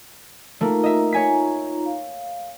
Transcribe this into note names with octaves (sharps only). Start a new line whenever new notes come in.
A3 A#3 D#4 F4 A#5
D#5 E5
C#5 G#5 B6
F5